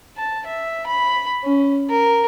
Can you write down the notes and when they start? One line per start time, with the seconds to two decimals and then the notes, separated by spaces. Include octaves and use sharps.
0.17 A5
0.47 E5
0.86 B5
1.44 C#4
1.90 A#4